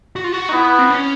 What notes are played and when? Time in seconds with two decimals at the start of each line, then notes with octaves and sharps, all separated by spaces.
0.16 F#4
0.24 F4
0.32 F#4
0.49 D#4
0.53 B3 E4
0.79 C4
0.90 C#4